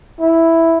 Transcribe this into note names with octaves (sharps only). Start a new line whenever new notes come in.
E4